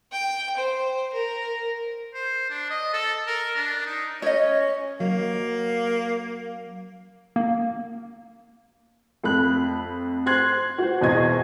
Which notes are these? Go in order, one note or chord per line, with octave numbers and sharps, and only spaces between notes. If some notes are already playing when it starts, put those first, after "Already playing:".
G5
C5
A#4
C5
D4
D#5
A4
A#4
D4
D#4
C#4 C#5 D#5
F#3 A#3
A#3
F2 A3 B5 F#6
C5 C6 F#6 G#6 C7
F#4 C5
E2 B2 C5 D#5 G#6